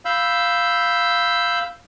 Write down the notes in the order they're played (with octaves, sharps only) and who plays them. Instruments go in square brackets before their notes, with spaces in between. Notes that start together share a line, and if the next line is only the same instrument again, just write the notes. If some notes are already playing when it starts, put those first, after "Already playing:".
[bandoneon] F5 B5 E6 G6